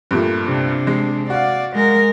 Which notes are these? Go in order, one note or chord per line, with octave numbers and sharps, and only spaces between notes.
G2 A#2 A3
C3 D4
G#3
F#4 D5 F5
G#3 A#4